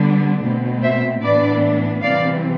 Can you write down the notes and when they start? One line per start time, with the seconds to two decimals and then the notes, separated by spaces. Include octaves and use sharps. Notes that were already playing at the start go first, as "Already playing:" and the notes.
Already playing: D3 G3 B3 D4
0.43 B2 A3 C4
0.82 C5 E5
1.22 A2 E3 B3 D4 B4 D5
2.03 C3 E3 G3 C4 D5 F5